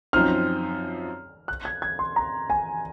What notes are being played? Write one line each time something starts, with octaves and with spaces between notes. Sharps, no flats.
F#2 F3 C4 D#4 F6
F#6
G#6
G#6
C6
A#5
G#5